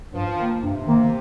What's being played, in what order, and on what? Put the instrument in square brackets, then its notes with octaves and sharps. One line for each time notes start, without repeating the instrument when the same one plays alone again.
[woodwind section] G2 [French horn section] F3
[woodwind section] D#3 A#3
[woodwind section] G2 [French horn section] C3
[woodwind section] D#3 A#3